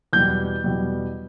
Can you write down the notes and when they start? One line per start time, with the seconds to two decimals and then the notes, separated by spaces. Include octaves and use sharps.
0.13 E2 B2 G3 G6
0.64 E2 B2 G3